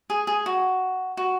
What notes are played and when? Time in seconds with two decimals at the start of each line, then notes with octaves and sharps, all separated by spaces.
0.10 G#4
0.27 G#4
0.46 F#4
1.17 F#4